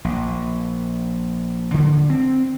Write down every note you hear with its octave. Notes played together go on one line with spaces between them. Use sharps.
A#1
D3
C4